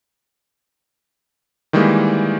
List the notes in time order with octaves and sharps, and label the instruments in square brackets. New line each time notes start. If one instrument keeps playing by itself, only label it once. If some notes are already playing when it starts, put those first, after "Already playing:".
[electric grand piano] D#3 E3 G3 G#3 A#3